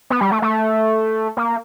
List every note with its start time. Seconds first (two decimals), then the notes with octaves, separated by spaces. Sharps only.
0.10 B3
0.21 G3
0.32 A3
0.42 A3
1.37 A#3